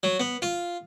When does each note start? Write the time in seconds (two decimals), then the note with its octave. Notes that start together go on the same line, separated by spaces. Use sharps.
0.03 F#3
0.20 B3
0.42 F4